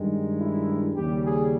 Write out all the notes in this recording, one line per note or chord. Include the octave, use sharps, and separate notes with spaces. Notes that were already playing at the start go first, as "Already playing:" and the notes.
Already playing: G2 D#3 G#3
E4
D#2 C#3 G3 G4
G#4